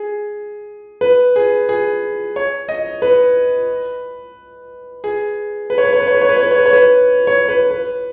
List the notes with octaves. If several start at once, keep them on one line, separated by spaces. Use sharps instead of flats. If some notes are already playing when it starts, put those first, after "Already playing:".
Already playing: G#4
B4
G#4
G#4
C#5
D#5
B4
G#4
B4
C#5
B4
C#5
B4
C#5
B4
C#5
B4
C#5
B4
C#5
B4
C#5
B4
C#5
B4
B4